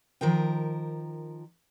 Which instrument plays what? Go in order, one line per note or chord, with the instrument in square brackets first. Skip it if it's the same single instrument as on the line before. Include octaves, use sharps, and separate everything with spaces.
[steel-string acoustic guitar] D#3 F3 A#4 G5